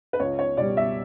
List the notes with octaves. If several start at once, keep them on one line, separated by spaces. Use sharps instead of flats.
B4
C#2 C#5
C#5
B2 G3 D5
E5